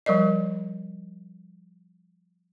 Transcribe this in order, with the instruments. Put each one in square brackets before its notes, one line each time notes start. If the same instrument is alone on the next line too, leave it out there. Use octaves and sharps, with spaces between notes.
[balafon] F3 G3 A#4 D5 D#5